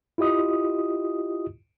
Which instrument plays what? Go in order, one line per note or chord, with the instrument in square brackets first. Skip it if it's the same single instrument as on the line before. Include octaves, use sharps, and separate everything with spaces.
[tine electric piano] E4 F4 G4 D#5 D#6